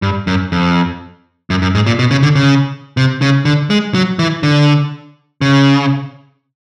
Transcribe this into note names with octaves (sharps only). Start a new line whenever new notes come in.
G2
F#2
F2
F#2
F#2
G#2
A#2
B2
C#3
D3
C#3
C3
C#3
D3
G#3
F#3
E3
D3
C#3